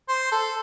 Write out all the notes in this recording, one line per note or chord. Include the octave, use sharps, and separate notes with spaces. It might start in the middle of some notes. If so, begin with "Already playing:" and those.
C5
A4